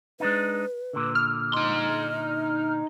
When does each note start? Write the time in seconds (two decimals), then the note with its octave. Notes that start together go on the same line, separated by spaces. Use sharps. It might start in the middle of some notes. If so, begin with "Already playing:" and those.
0.20 G#3 D4 D#4 B4
0.93 A#2 D3
1.15 F6
1.54 D#4 D#5 C6